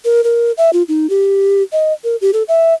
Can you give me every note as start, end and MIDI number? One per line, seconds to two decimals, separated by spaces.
0.05 0.24 70
0.24 0.52 70
0.58 0.70 76
0.73 0.83 65
0.88 1.09 63
1.10 1.63 67
1.73 1.93 75
2.04 2.16 70
2.21 2.31 67
2.33 2.43 69
2.48 2.74 76